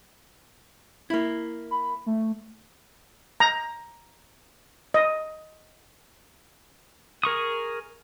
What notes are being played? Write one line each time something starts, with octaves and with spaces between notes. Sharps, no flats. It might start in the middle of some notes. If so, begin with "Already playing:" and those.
A#3 E4
B5
A3
A#5
D#5
G#4 A#4 C#6 D#6